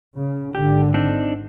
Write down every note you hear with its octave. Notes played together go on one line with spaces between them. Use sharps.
C#3
G#1 D3 G4
C4 D4 D#4